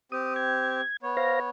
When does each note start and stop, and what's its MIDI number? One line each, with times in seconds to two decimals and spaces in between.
0.12 0.81 60
0.12 0.81 67
0.12 0.34 87
0.36 0.97 92
1.03 1.50 59
1.03 1.50 73
1.17 1.40 72
1.17 1.40 77
1.17 1.40 94